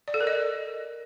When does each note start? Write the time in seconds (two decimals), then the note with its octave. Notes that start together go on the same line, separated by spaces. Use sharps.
0.08 D5
0.14 A4
0.21 A#4
0.27 D#5